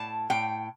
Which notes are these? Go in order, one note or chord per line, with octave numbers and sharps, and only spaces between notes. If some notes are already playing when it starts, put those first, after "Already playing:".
Already playing: A2 A5
A2 G5